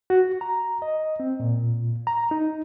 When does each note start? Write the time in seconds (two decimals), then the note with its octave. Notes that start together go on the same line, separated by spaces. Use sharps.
0.10 F#4
0.41 A#5
0.82 D#5
1.20 C4
1.40 A#2
2.07 A#5
2.31 D#4